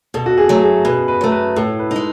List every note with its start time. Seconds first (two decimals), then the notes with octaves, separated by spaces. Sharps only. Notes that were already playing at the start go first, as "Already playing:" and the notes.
0.14 B2 A4
0.26 F#4
0.38 G#4
0.49 F#3 A3
0.62 G#4
0.85 B2 B4
1.08 B4
1.21 F#3 A3
1.32 B4
1.56 A2 A4
1.79 B4
1.91 G#3 D#4